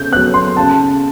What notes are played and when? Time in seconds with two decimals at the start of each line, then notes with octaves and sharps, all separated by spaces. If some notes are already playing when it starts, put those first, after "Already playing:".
Already playing: C#3 G6
0.12 B3 F#6
0.16 F#3
0.34 C6
0.57 C#3 A5